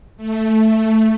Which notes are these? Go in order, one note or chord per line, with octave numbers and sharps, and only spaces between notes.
A3